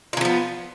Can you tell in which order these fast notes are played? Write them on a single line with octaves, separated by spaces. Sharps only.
F4 E3 F3 B3